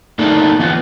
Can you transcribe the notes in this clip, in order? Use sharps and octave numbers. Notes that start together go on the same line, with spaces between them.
A3 A#3 D4 D#4 A4 A#4
E3 B3 F4